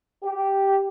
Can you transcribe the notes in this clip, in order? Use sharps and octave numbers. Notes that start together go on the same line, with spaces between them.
G4